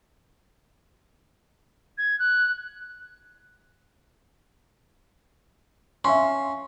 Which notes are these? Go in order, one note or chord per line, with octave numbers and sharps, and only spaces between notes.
G#6
F#6
C#4 E5 F5 C6